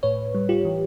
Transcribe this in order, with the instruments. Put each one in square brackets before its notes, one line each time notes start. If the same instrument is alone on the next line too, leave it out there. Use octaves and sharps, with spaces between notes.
[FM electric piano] A2 B4 C#5
G3
F4 G4
E3